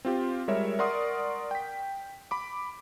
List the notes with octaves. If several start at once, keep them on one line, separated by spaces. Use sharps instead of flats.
C4 F4 G4
G3 G#3 A#4 C#5 E5
A#4 D5 F#5 C6 C#6 D#6
G5 B6
B5 D6